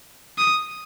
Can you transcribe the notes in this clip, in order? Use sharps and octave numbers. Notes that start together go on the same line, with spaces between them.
D#6